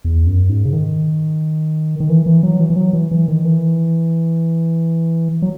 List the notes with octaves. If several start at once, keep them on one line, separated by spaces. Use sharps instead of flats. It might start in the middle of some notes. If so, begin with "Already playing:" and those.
E2
F#2
G#2
C#3
D#3
D#3
E3
E3
F#3
E3
E3
F#3
E3
E3
D#3
E3
F#3